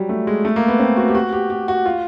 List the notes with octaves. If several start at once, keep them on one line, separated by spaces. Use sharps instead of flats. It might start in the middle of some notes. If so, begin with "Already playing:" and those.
Already playing: F#3 G3
A3
G#3
A3
A#3
B3
C4
F#4
G4
F#4
G4
G4
F#4
F4